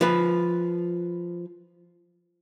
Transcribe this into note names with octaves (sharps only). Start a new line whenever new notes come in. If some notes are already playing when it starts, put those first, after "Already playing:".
F3 B4